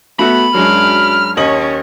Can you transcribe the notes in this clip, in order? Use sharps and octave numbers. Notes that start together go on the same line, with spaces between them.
A3 B3 F#4 E5 B5
F#2 F#3 G#3 D4 F6
D#2 C#4 C#5 D#5 F#7